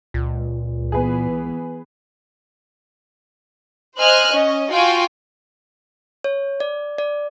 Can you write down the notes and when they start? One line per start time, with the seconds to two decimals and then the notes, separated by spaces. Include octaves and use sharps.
0.14 C#2 A#2
0.92 E3 B3 G#4 B4
3.99 C5 D#5 G#5 F6 F#6
4.32 C#4 D#5
4.72 F4 F#4 G5 G#5
6.24 C#5
6.60 D5
6.98 D5